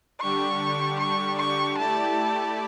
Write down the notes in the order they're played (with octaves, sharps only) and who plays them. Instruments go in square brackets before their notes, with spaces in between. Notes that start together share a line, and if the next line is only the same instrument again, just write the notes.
[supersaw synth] D3 G3 D4 G4 [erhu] C#6
[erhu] C#6
C#6
[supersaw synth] A3 E4 G4 D5 [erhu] A5